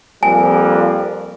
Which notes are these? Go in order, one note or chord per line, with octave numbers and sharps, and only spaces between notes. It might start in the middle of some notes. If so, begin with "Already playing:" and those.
F2 G3 A#3 G#5